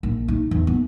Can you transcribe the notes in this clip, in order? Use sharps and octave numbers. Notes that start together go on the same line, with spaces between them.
A#1
D#4
E2
B3